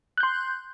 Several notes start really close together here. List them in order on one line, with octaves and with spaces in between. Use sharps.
F#6 G6 C6